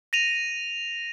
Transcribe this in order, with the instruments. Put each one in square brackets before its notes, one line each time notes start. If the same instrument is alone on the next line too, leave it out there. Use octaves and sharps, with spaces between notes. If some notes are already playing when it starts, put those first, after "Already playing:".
[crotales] A#6 D#7 F7